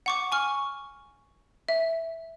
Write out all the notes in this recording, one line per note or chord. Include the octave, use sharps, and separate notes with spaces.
F#5 C#6 D6
G#5 C#6 F6
E5